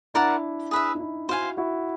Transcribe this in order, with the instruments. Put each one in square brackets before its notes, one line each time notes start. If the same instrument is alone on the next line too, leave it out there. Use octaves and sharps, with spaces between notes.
[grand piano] D4 E4 [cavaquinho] A#4 D5 F#5 A5
[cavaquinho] G#4 B4 E5
[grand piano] D#4
D4 E4
[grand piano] E4 F#4 [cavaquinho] C5 F5 G#5
[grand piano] E4 F#4